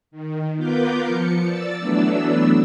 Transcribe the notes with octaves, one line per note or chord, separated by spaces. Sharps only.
D#3
B3 F4 A#4 B4 D6 G6
F3 C#7
D5 E6 A6
E3 F#3 A3 B3 D4 E6